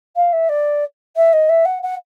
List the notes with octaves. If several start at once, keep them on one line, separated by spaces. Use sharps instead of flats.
F5
E5
D5
E5
D#5
E5
F#5
F#5